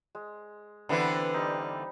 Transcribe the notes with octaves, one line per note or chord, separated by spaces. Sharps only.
G#3
D3 E3 G3 B3 C4 B5
G3 D#4